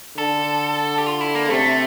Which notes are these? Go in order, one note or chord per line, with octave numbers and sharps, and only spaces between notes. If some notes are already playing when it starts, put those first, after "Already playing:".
D3 A4
G4
F4
E4
A#3
C3 A3